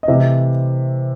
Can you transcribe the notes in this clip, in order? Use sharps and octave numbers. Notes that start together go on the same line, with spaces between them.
D#5
C3 E3 A3 E4 E5